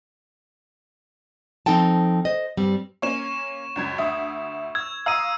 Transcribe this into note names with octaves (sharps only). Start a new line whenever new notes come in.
F3 C4 D#4 A4 G5 A5
C5 D#5
G2 G3 C4
A#3 C#4 C#6 E7
C#2 F#2 G#6
D2 E5 D#6
E6 G#6
F5 A#5 D#6 E6 D#7